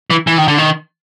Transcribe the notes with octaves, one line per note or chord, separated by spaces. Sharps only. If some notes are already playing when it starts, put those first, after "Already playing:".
E3
E3
D#3
D3
D#3